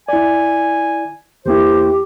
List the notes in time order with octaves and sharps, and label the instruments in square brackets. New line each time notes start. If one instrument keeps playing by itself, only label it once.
[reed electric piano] E4 D5 [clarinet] G#5
[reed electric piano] E2 A#3 E4 [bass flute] G4 [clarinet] C5